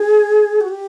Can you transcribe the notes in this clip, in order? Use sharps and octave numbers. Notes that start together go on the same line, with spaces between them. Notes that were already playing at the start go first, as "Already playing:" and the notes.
Already playing: G#4
F#4
G4